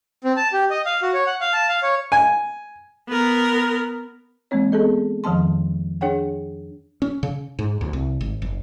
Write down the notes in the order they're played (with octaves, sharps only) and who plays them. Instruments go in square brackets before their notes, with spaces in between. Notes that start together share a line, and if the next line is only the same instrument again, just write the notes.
[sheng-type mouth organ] C4
A5
G4
D#5
F5
F#4
C#5
F#5
F5
A5
F5
C#5
[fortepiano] G#5
[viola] B3 A#4
[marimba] E3 G#3 A#3 C4 C#5
B3 G#4 A4 D#5
F2 D#3 F3 D#5 A5 C6
D4 G#4 C#5 F#5 G5
[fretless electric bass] C#4
C#3
G#2
D2
C2
G#1
F#1